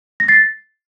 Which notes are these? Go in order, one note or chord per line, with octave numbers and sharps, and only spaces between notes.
A#6
A6 C7